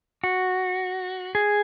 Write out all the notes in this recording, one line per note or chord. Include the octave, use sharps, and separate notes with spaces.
F#4
G#4